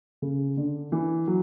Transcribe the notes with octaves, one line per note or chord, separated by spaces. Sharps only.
C#3
D3
E3
F#3